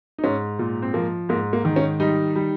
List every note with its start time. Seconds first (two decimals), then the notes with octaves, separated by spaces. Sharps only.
0.18 D#4
0.24 G#2 C#4
0.59 A#2
0.82 C4
0.94 F3 A#3
1.29 G#2 A#3
1.53 A#3
1.65 D#3
1.76 C#4
2.00 G3 D#4
2.36 G3